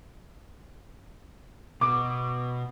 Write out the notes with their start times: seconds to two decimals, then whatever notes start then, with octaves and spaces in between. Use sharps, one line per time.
1.81 B2 D6